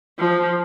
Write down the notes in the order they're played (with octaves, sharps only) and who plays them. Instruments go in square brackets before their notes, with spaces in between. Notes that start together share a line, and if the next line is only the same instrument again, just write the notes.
[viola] F3